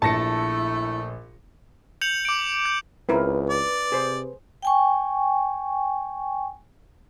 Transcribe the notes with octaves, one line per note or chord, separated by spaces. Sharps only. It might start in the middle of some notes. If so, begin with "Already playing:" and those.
A#1 A3 E4 A5 A#6 C#7
G6 C#7 F7 F#7
D6 D7
G6
C#2 C4 E4 A#4 B4
D5
C3 G#4 C5
G5 G#5 C#6